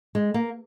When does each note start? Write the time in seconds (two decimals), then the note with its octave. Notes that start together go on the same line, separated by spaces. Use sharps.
0.15 G#3
0.34 A#3